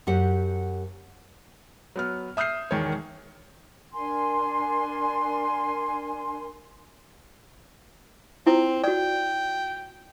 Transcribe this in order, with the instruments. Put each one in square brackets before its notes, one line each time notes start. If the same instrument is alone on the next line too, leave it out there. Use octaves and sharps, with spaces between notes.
[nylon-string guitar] F#2 G4 F#5
[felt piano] F#3 B3 F6
E5 D#6 F6 G6 C7
E1 D#3 G#3 C#5
[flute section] D4 A#4 G#5 C6
[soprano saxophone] C4 [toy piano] E4 F4
[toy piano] F#4 D5 [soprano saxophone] G5